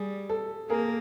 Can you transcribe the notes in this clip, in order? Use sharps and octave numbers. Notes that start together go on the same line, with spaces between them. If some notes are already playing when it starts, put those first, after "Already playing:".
Already playing: G3 G#4
A4
A#3 G#4 A#4